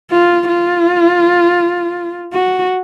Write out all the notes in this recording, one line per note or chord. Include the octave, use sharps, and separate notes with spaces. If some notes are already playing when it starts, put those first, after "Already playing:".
F4
F4
F#4